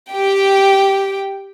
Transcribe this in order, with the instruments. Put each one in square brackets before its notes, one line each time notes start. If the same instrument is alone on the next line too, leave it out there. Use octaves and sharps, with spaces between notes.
[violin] G4 G5